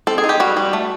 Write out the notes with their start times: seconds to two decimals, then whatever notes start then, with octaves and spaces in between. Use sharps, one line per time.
0.07 C4 A4
0.18 G#4
0.24 D#4
0.29 G4
0.40 G3 F#4
0.57 G3
0.73 A3